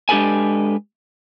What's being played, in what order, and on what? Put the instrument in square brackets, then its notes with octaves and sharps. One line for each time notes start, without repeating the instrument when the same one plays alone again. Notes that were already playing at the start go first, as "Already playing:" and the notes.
[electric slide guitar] G#3 D4 G4 A4 B4 G#5